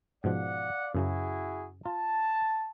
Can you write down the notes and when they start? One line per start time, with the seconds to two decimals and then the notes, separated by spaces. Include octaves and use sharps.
0.24 G#2 B2 F3 D5 F5 F#5
0.95 F#2 C#3 F#3 E4 F#4 G#4
1.86 F4 A5